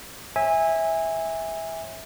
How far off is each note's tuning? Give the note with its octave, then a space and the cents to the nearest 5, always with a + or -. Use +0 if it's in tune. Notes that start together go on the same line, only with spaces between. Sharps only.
C#5 -20 E5 -15 G#5 -20